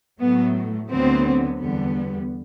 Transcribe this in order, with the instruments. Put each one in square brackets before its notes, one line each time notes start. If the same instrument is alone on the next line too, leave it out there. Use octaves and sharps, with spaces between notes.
[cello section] A2 F#3 A3 B3
D2 D3 F#3 B3 C4
E2 D3 G3 B3